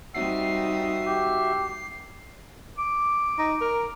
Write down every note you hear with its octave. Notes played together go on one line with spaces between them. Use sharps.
G3 C4 D#4 F#4 E5 C7
G4
D6
D#4
A#4